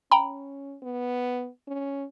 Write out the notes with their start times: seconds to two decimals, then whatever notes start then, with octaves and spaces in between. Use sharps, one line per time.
0.11 C#4 G5 A#5 B5
0.83 B3
1.68 C#4